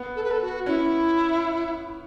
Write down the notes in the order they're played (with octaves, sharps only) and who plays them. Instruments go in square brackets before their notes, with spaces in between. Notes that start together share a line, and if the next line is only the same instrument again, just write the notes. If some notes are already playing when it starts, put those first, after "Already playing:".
Already playing: [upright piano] B3
[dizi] A4
B4
A4
F#4
[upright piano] C#4 [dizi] E4